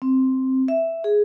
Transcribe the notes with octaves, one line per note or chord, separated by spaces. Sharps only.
C4
E5
G#4